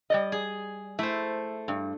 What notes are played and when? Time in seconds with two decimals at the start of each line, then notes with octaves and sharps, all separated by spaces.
0.10 G3 D5 D#5
0.32 G#4
0.99 A3 E4 C5
1.68 G2